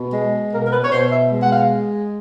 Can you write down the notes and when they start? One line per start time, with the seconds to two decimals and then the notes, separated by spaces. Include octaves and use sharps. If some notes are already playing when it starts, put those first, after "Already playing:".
Already playing: B2
0.13 G#3
0.53 B2 A#4
0.66 A#4
0.72 B4
0.84 C#5
0.92 B2 C5
1.12 E5
1.31 G#3
1.41 F#5
1.51 F5